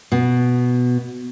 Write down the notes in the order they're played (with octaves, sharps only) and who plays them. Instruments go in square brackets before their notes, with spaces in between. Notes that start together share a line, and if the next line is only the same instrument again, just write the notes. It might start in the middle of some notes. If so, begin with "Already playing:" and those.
[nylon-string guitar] B2